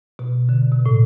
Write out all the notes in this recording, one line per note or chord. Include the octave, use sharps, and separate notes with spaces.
B2
D3
B2
A2